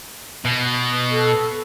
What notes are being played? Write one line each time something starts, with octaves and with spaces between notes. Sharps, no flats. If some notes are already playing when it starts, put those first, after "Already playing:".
B2
A4